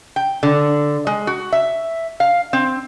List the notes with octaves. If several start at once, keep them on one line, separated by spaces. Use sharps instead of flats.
G5
D3
G#3
F#4
E5
F5
C4